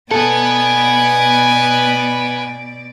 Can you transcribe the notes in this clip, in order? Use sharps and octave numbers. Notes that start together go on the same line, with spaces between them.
B2 A4 B4 D5 F#5 G#5